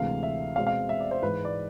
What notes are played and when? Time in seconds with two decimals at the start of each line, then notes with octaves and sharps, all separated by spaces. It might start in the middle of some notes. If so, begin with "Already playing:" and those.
Already playing: D2 C3 E3 G#3 F5
0.23 E5
0.56 B2 G#3 C4 F5
0.67 F5
0.89 E5
1.00 D5
1.11 C5
1.22 G#2 E3 G#3 B4
1.45 D5